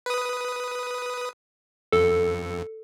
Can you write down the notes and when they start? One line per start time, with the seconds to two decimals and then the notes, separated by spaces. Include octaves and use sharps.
0.06 B4 D#6
1.92 F2 A4